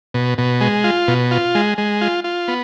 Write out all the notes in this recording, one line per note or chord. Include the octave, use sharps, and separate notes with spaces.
B2
B2
G#3
F4
B2
F4
G#3
G#3
F4
F4
B3